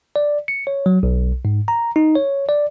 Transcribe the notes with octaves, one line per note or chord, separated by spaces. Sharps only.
D5
C#7
C#5
F#3
B1
G#2
A#5
D#4
C#5
D5